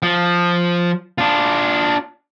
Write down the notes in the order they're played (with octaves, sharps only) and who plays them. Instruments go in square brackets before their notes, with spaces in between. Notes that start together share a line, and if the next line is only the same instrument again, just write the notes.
[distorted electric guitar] F3
D4 F4